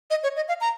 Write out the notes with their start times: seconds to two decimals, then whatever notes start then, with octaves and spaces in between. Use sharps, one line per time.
0.10 D#5
0.23 C#5
0.36 D#5
0.48 F5
0.61 A#5